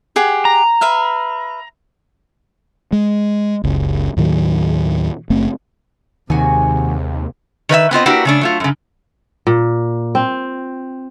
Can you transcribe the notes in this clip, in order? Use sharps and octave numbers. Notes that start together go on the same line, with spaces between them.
G4 G#4 F#5
A#5
B4 E5 F5
G#3
F#1 C#2
D#2 A2 D#3 F#3
F#1 A3 C4
D#2 C3 D#3 G#3 F#4 G#5
D#3 B4 D#5 E5
B3 C4 F4 D#5
A#3 D4 E4 F#4 G4 B4
C#3 A3 D4
F#3 A3 F4
F#2 C#3
A#2
C4